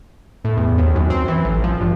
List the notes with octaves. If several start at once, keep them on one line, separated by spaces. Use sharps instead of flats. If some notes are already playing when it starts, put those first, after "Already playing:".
A2
E2
D#2
F#2
C4
E3
A1
F3
G2